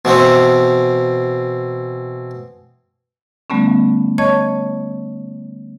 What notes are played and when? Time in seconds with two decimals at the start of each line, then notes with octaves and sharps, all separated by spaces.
0.05 B2 E3 B3 C4
3.50 D3 G3 A3 B3 C#4
4.18 C#5 D#5 A5 C#6 G#6